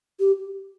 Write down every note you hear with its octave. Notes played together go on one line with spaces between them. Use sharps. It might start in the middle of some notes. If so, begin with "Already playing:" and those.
G4